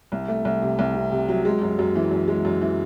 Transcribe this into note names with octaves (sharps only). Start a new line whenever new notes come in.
C2
A3
C2
C3
C2
C3
C3
F#3
G#3
F#2
F#2
E3
F#2
G#3
F#2
E3